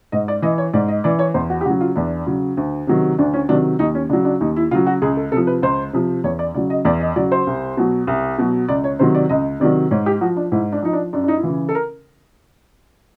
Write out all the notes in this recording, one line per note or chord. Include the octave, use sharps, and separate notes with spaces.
G#2 D#5
D5
E3 D#5
C#5
G#2 D5
D#5
E3 D5
C#5
E2 C5
F#4
G4
C#3 F#3 F#4
F4
E2 D4
C#3 F#3
D2
C3 D#3 F#3
D2 D4
C#4
C3 D#3 F#3 D4
D#2 D#4
C#4
C#3 F#3 D4
D4
D#2 D#4
E4
C#3 F#3 F4
F#4
C#2 G#4
A4
C3 F3 A4
B4
C#2 C5
C3 F3
E2 C#5
D5
C#3 F#3 D5
D#5
E2 D5
D#5
C#3 F#3 D5
C5
C2
B2 F#3
C2
B2 F#3
C#2 D5
C#5
C3 D#3 F#3 C5
D5
C#2 D#5
C3 D#3 F#3 D5
G#2 C#5
G4
F3 F#4
D4
G#2 E4
D4
F3 D#4
D4
F#2 D4
D4
D#4
E4
C#3 E3 F4
A4
A#4